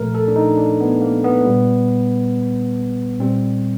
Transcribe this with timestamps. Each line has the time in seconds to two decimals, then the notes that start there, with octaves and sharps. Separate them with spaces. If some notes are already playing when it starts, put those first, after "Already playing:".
Already playing: A#2 F3 A3 A#4
0.15 A4
0.28 D4
0.36 D#4
0.57 D4
0.80 B3
1.02 A#3
1.24 B3
1.45 A#2 G3
3.19 A#2 G3 C4